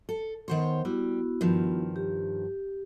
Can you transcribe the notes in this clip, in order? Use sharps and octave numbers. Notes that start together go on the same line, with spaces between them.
A4
D#3 B3 C5 C#5 F#5 C6
G3 B3 E4 F#4
G2 D#3 F3
G4